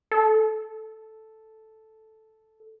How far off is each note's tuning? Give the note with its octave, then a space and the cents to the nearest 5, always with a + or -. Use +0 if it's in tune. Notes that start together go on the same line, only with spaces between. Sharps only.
A4 -5